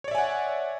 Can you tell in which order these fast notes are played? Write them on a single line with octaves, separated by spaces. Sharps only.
C#5 D5 E5 G#5 F#5